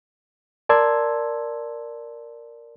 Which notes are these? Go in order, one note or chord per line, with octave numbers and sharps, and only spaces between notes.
A#4 D5 A5 C6 E6 G#6